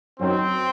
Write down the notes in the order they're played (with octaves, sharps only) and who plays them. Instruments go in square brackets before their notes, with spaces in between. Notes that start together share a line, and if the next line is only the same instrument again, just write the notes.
[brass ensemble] F#2 D#3 F#3 C4